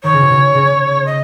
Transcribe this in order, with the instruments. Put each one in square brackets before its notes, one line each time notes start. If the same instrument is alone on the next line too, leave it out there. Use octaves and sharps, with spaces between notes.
[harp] D#3 [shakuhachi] C#5
[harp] C#3
B2
C#3
C#3
[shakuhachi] D#5